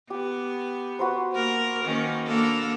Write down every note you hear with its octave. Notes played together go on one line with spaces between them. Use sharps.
B3 G4
F#4 B4 C5
A#3 A#4
D#3 A#3 C#4
A#3 D4 A4